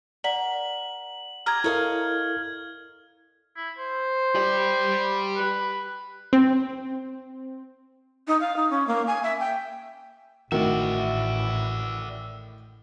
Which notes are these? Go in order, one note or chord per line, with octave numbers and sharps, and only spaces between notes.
A#4 D5 F#5 B6 F#7
G4 A#5 D#6 F6 G#6
E4 A4 A#4 C#5 D#5 F5
E4
C5
G4 D5
B4
C4
D#4
F5
D#4
C#4
A#3
G#5
E5
G5
A1 A2 D#3 E3 F#4 D5 E5